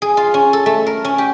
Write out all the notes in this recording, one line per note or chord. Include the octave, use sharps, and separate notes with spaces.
G#4
F4
C#4
A4
A3
A#4
C#4
G4